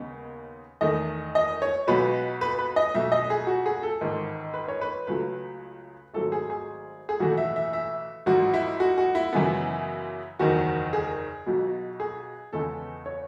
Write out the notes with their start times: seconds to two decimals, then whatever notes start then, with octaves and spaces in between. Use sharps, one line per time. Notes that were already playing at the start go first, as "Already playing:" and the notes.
Already playing: D#2 C#3 G#3 B3
0.81 E2 D#3 A3 D#5
1.35 D#5
1.62 C#5
1.87 B1 B2 G#3 B3 B4
2.41 B4
2.59 B4
2.76 D#5
2.95 B1 B2 A3 E5
3.12 D#5
3.30 G#4
3.47 F#4
3.66 G#4
3.83 A4
4.01 A1 G#2 D#3
4.54 B4
4.68 C#5
4.81 B4
5.07 C#2 C#3 F#3 A3 B4
6.14 G#1 G#2 F#3 A3 A4
6.32 G#4
6.50 G#4
7.09 G#4
7.20 B1 A2 E3 A3 F#4
7.37 E5
7.56 E5
7.73 E5
8.26 A1 G#2 F#3 F#4
8.54 E4
8.80 F#4
8.98 F#4
9.15 E4
9.33 F#2 C#3 E3 G#3 B3
10.39 F#1 E2 D#3 F#4
10.93 G#4
11.46 B1 B2 F#3 B3
12.00 G#4
12.53 E2 C#3 G#3 B3 A4
13.06 C#5